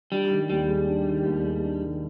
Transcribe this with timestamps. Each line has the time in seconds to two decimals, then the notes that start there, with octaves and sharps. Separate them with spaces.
0.12 G3 D4
0.31 D#3
0.50 D#2 G3
0.69 G#3
0.87 D4
1.07 D#3
1.25 D#2
1.44 G#3
1.64 D4
1.82 D#3